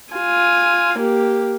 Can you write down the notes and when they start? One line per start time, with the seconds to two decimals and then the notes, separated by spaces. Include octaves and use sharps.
0.13 F4 G#5
0.99 A#3 G4